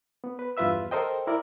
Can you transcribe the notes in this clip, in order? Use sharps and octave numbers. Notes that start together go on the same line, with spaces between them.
B3
B4
E2 G2 F4 B4 E5 E6
A4 A#4 C5 D#5 G5
E4 A#4 D5